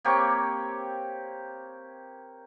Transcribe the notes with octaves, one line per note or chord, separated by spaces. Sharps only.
A#3 C4 G4 C#5